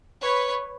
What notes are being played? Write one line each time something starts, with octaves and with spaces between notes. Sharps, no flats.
B4 C#5